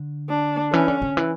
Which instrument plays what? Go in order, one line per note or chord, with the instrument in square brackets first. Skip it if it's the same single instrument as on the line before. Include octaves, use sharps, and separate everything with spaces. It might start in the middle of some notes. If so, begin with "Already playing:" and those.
Already playing: [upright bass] D3
[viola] D4
[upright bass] E3 [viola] C#4
[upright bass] D3
D3
E3